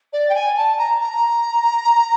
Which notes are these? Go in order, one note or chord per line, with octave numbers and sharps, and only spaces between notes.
D5
G5
G#5
A5
A#5
A#5